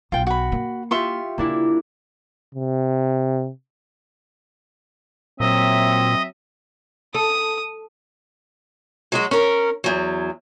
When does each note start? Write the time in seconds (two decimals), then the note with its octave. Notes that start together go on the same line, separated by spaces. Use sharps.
0.12 B1 F4 G5
0.27 F#4 B5
0.52 A#3
0.91 F4 G4 E5 C6 C#6
1.38 C#3 A#3 D4 E4
2.55 C3
5.40 A#2 F#3 C4 D#5 E5
7.14 A4 D#6
9.12 F#3 G#3 F#4
9.31 C#4 A#4
9.84 E2 F#3